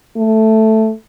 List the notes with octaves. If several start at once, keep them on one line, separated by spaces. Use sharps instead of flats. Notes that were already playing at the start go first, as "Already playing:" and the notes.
A3